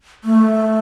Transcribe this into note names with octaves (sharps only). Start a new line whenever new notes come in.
A3